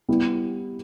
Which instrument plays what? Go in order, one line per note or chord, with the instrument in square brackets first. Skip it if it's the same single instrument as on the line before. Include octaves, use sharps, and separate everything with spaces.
[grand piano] G3 B3 E4 G4